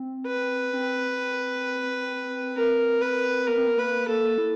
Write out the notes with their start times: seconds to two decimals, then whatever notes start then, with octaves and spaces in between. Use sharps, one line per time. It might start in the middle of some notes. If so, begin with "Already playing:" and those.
Already playing: C4
0.27 B4
0.73 C4
2.56 C4 A#4
3.01 B4
3.47 B3 A#4
3.57 C4
3.67 B3
3.77 A#3 B4
4.08 A#3 A4
4.38 E4